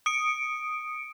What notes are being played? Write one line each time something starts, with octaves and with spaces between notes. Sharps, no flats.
D#6 C#7 D7